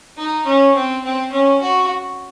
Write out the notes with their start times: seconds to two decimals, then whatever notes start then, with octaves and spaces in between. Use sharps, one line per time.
0.18 D#4
0.46 C#4
0.75 C4
1.05 C4
1.32 C#4
1.62 F#4